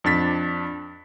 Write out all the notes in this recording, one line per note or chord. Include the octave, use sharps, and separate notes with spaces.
F2 D4 A6 B6